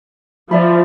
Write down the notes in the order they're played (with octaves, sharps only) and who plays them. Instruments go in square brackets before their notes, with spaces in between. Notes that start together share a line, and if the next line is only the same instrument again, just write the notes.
[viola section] F3 [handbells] D5 E5 B5